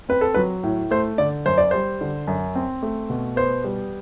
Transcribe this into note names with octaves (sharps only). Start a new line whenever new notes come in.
C4 B4
A4
F#3 B4
A2
A3 C5
D3 D5
F#2 C5
D5
G3 C5
D3
F#2
C4
A3
B2
B3 C5
G3